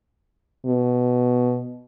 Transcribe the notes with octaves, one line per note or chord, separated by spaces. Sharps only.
B2